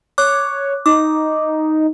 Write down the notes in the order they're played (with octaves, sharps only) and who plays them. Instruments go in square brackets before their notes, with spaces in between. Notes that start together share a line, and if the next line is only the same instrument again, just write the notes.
[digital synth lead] C#5 [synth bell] D6 F#6
[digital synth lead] D#4 [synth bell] D6